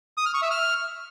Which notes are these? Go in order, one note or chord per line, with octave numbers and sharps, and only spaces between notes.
D#6
F6
C#6
E5
F6